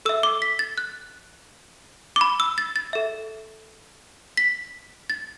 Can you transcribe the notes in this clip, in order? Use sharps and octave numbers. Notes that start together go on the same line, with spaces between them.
A4 E5 E6
D6
B6
A6
F#6
D6
B5
E6
A6
A6
A4 E5
B6
A6